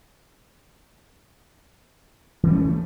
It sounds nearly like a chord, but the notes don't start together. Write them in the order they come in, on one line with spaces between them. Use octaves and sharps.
E3 G3 C#4 A3